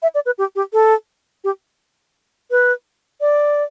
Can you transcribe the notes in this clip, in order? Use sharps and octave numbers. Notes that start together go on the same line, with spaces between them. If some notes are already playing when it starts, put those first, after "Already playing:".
E5
D5
B4
G4
G4
A4
G4
B4
D5